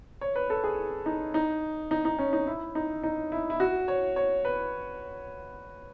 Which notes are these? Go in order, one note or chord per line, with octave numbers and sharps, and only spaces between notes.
C#5
B4
A4
G#4
D#4
D#4
D#4
D#4
C#4
D#4
E4
D#4
D#4
E4
E4
F#4
C#5
C#5
B4